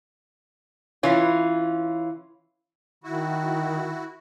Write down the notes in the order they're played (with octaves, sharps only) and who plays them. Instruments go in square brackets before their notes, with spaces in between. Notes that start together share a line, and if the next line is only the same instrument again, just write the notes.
[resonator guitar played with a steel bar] E3 C#4 F4
[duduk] D#3 [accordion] E4 F#4